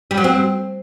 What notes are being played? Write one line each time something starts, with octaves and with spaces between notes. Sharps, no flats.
G3
F#3
C4